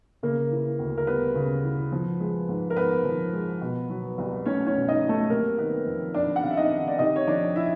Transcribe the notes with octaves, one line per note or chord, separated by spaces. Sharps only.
C#3 A#3 A#4
E3
D2
A#4
G3 B3 B4
C#3
E3
F3
G#3
G#2
A#4
G#2 B3 B4
F3
G#3
B2
F#3
C2
A3 C#4 C#5
C#4 C#5
B2
D#4 D#5
F#3
A3 A4
C3 A#3 A#4
D#3 B3 B4
F2
F2 D4 D5
F#5
C3 F5
E5
D#4 D#5
D#3
D5
C3 D#4 D#5
C#5
F3 D4 D5
E4 E5